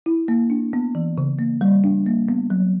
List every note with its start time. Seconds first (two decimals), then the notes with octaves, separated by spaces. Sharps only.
0.06 E4
0.28 A#3
0.50 D4
0.73 B3
0.95 E3
1.18 C#3
1.39 A#3
1.61 G3
1.84 D4
2.06 A#3
2.29 B3
2.50 F#3